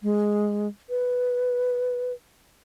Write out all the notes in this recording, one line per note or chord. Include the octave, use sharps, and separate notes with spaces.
G#3
B4